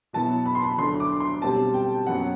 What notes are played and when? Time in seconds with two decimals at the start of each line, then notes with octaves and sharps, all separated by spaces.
0.13 B2 F#3 B3 E4 A5
0.46 B5
0.55 C6
0.64 B5
0.78 D2 D3 F#3 A3 D4 C6
1.00 D6
1.20 C6
1.42 B2 G3 C4 A5
1.74 G5
2.07 F#2 F#3 B3 F#5